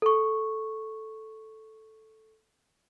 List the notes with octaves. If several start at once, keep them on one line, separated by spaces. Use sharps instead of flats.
A4 C#6